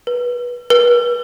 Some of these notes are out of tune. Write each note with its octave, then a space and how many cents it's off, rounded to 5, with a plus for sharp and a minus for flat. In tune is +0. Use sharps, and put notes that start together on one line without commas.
B4 -20
B4 -40